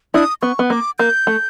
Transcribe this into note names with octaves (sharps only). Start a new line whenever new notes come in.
D4 E4 D#6
B3 C#6
B3
A#3 D6
A#3 G6
A3